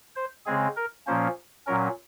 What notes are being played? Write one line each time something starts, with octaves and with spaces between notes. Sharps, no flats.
C5
C#3 G#3 C4 G#4
A#4
A#2 F3 A#3 C#4 C5
A#2 F#3 C#4 A#4